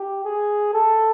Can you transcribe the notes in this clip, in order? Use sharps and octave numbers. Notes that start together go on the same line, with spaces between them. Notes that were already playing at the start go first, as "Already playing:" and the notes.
Already playing: G4
G#4
A4